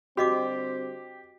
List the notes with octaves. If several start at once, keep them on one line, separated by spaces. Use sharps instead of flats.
D3 G3 C4 F#4 G4 D#5 D6